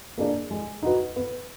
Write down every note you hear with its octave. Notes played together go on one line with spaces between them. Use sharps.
A#3 D4 G#4 D5
G#3
D#4 F#4 B4
B3